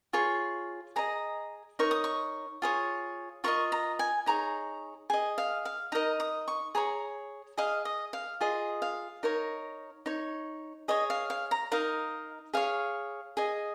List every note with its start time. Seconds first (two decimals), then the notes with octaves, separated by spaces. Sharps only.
0.13 F4 G#4 C#5 C#6
0.96 G#4 D#5 A#5
1.79 D#4 A#4 C#5 C#6
1.91 D#6
2.04 C#6
2.62 F4 G#4 C#5
3.44 F4 A#4 D#5 C#6
3.72 A#5
3.99 G#5
4.26 D#4 G#4 C#5 A#5
5.10 G#4 D#5 G#5
5.38 F5
5.65 F5
5.92 D#4 A#4 D#5 A#5
6.20 D#6
6.48 C#6
6.75 G#4 C#5 A#5
7.57 G#4 D#5 F5
7.85 D#5
8.13 F5
8.40 F4 G#4 D#5
8.82 F5
9.23 D#4 A#4 C#5
10.06 D#4 C#5
10.88 G#4 C#5 D#5
11.10 F5
11.30 F5
11.51 A#5
11.72 D#4 A#4 D#5 F5
12.53 G#4 C#5 F5
13.37 G#4 D#5